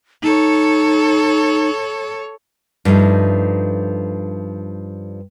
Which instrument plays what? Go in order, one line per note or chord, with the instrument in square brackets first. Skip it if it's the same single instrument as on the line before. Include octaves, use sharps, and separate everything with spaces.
[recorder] D#4 [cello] A4 C#5
[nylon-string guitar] G2 F3 A3 D#4